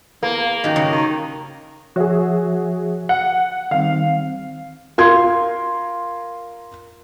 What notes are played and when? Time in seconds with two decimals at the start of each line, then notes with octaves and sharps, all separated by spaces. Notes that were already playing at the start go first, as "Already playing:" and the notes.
0.23 E2 A#3
0.64 F#2 D#3 G4
0.76 C#3
0.92 D#3
1.96 F3 F#4 G#4 C#5 E5
3.09 F#5
3.71 D#3 G3 C4 F5
4.98 F4 A#4 C6 G#6